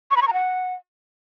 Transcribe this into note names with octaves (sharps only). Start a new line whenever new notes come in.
C#6
B5
C#6
A#5
F#5